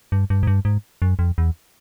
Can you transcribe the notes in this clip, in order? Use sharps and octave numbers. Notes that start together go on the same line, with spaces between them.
G2
G2
G#2
G2
G#2
F#2
F2
E2